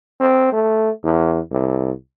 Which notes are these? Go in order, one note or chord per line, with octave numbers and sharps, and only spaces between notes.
C4
A3
E2
C2